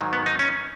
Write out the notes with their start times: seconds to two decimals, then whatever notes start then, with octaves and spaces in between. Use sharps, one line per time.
0.01 G#2 D#3 F#3
0.13 B3
0.26 D#4
0.39 C#4